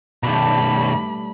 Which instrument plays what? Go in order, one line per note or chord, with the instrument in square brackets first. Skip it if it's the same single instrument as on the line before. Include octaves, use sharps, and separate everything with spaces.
[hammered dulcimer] G2 A3 [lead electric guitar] B2 D#3 [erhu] B5